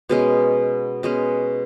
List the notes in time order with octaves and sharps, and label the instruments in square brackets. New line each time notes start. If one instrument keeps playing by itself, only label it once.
[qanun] B2 G#3 C#4
B2 G#3 C#4